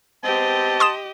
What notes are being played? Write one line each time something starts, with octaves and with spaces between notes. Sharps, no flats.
G#3 B3 C4 G4 D#5 A5
C6 D#6 E7